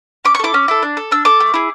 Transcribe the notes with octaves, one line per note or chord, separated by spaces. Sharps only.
C#4 D6
C#6
E4 A4 D6
C#4
E4 A4
D4
A4
D4 E6
A4 D6
A3
E4 G#4